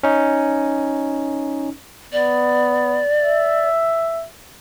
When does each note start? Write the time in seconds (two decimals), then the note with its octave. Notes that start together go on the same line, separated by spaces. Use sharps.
0.03 C#4 D#4
2.13 B3 D5
3.19 E5